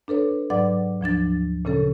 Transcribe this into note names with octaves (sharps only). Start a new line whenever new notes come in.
D4 A4 B4 C#5
G#2 F#3 B4 D5 F#5 D6
D2 F3 D4 A6
A#2 C#3 C#4 A4